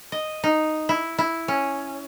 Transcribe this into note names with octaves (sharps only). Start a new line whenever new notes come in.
D#5
D#4
E4
E4
C#4